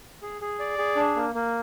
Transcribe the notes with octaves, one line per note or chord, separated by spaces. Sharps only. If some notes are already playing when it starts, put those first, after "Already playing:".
G#4
G#4
D5
G#4
D4
A#3
A#3